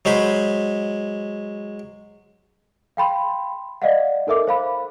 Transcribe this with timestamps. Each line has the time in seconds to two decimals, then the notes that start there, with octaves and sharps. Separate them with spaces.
0.05 F#3 G#3 C5 B5
2.97 F5 G5 B5 C6
3.82 D5 D#5 F5 F#5
4.27 D#4 A4 A#4 E5 D6
4.47 C5 F5 B5